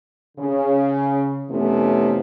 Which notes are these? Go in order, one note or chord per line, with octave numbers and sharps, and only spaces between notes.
C#3
F2 C3 E3 A3 B3 C#4